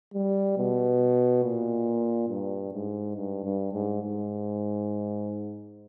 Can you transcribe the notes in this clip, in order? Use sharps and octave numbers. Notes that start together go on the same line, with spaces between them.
G3
B2
A#2
G2
G#2
G2
G2
G#2
G#2